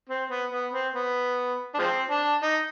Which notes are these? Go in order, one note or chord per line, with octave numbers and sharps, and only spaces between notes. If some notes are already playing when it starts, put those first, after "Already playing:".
C4
B3
B3
C4
B3
D4
F3 G#3 C4
D4
D#4